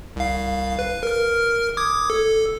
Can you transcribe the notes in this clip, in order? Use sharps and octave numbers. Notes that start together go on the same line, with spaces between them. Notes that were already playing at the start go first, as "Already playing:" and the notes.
C2 F5
B4
A#4 F6
D6 D#6 G#6
A4